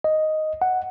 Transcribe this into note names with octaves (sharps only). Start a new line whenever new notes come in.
D#5
F#5